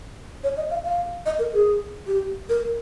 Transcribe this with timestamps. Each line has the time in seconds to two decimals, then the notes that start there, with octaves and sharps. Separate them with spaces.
0.44 C#5
0.57 D#5
0.71 F5
0.85 F5
1.26 D#5
1.39 A#4
1.54 G#4
2.07 G4
2.49 A#4